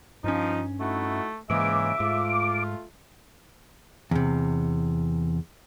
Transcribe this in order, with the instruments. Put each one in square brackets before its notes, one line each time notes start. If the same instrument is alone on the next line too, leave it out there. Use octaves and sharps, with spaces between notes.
[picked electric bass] G2 C#4 [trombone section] F3 [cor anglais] D#4
[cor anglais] A3 [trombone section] D#4 E4 F#4
[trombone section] C#2 C#3 G#3 [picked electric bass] G#2 E3 A#3 [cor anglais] E5 [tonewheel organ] D6
[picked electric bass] G#2 [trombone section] A3 F4
[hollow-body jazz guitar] E2 C3